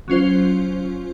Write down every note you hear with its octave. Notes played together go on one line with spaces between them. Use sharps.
F#3 C#4 F4 C5